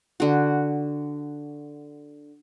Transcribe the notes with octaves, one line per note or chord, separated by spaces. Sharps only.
D3 F#4